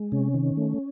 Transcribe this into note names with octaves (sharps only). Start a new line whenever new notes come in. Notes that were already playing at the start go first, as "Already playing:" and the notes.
Already playing: G#3
C3 C#4
D#3
A3